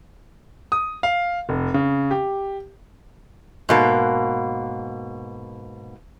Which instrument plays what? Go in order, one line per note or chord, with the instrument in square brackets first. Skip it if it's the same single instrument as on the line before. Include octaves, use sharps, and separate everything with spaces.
[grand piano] D#6
F5
F1
C#3
G4
[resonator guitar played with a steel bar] G#2 B2 A#3